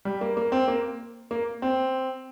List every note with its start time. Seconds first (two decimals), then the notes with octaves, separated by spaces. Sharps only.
0.05 G3
0.21 A#3
0.37 A#3
0.52 C4
0.68 A#3
1.31 A#3
1.62 C4